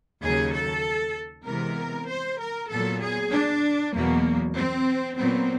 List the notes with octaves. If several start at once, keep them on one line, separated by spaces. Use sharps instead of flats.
D#2 C#3 F#3 G#4
A4
C3 E3 G#3 B3 A#4
C5
A#4
A#2 F#3 B3 A4
G#4
D4
E2 B2 F#3 A#3
C4
A#2 F#3 B3 C4